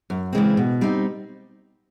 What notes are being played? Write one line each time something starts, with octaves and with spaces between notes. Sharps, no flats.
F#2
C#3 E3 G#3 C4
B2
G3 C4 D#4